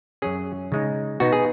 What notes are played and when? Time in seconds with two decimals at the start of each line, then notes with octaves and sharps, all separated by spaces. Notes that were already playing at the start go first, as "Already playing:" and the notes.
0.22 F#2 F#3 C#4 G#4
0.72 C#3 G#3 D#4
1.20 B2 B3 D#4 F#4
1.33 G#4